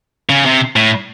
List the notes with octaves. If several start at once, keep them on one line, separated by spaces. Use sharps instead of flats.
C#3
C3
A2